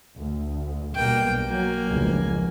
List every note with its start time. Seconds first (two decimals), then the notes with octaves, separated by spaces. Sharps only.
0.17 D2
0.95 B1 G2 B2 A#3 G5
1.48 F#3 A#3 G#5
1.90 F1 C#2